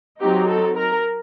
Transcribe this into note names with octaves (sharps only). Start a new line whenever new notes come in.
F#3 C4 D#4 G4
A4
A#4